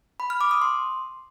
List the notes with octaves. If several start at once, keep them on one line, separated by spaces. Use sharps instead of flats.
B5
F6
D6
D#6
C6